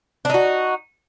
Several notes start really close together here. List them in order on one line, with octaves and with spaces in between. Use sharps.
D4 D#4 F#4